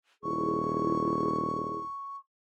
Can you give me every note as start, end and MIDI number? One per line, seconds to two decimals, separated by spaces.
0.23 1.82 27
0.23 1.80 64
0.23 1.80 68
0.23 2.17 85